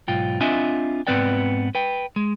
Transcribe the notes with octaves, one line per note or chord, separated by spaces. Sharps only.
B1 G#2 F4 G5
C4 D4 F4 D#5 E5 G#5
G#2 B3 C4 B4 D5 G5
B4 G5
G#3